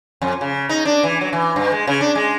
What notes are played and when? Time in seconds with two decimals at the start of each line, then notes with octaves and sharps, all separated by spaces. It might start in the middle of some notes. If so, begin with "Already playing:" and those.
0.22 F2
0.41 C#3
0.69 D#4
0.85 D4
1.03 E3
1.21 F#3
1.33 E3
1.56 G2
1.72 G#3
1.87 C#3
2.01 D4
2.15 G#3